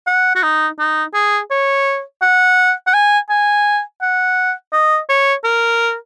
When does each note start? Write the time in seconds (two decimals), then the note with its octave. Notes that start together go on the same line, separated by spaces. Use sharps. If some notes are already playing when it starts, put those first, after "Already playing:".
0.07 F#5
0.35 F#4
0.43 D#4
0.79 D#4
1.14 G#4
1.51 C#5
2.22 F#5
2.87 F#5
2.94 G#5
3.30 G#5
4.02 F#5
4.73 D#5
5.09 C#5
5.44 A#4